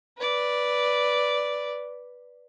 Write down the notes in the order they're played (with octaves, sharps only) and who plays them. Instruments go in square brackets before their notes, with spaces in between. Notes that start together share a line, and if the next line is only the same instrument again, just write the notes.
[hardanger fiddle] B4 D5